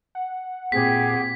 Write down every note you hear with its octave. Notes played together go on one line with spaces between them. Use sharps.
F#5
A#2 C4 G4 G#4 B6